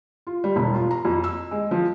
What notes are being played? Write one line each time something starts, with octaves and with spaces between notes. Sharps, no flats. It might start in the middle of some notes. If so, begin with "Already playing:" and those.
F4
G3
E1
F4
A#5
F2
E6
G#3
F3